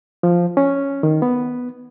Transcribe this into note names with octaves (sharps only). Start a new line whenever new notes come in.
F3
C#4
D#3
B3